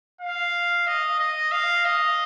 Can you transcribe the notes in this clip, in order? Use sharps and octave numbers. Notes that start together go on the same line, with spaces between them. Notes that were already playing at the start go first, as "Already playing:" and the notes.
F5
D#5
D#5
F5
D#5